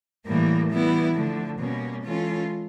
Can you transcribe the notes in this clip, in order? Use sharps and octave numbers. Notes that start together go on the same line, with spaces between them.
A2 E3 G3 A#3
E3 G3 B3 E4
D3 F3 A3
B2 G3 A#3 C#4
E3 G#3 C#4 F4 A4